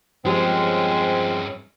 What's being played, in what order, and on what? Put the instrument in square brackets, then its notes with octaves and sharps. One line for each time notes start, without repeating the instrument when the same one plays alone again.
[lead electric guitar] G2 C#4 [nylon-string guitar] F3 G4 [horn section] G#3 C4